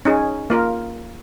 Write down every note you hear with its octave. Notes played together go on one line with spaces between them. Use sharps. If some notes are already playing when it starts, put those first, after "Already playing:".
C#4 D#4 G#4
A#3 F4 A#4